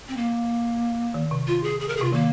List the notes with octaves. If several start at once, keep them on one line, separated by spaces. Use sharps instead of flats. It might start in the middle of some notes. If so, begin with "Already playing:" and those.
C4
A#3
D#3
C3
F4
G#4
G#4
A#4
G#4
C3 F4
D#3 A#3